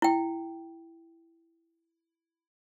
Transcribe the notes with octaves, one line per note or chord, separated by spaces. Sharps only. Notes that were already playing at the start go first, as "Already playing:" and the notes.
E4 G5